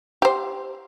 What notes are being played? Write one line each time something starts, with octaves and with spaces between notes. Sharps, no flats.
G4 C5